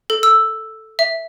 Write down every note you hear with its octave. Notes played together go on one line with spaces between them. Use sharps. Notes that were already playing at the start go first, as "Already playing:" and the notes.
A4
E6
E5